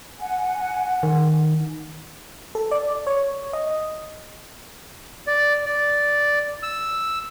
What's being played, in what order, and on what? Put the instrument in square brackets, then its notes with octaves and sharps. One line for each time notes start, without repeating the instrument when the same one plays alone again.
[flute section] F#5 G#5
[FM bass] D#3
[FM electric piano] A4
D5
C#5
D#5
[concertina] D5
D5
E6